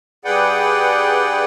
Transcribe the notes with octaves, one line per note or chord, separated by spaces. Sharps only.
G2 G#4 B4 D5 F#5 G5